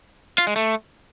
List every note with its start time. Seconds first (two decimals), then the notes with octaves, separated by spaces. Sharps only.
0.38 F4
0.47 G#3
0.56 A3